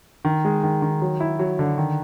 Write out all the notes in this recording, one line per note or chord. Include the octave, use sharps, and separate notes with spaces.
D#3
G#3
D#3
D#3
F#3
E4
F#3
D3
D#3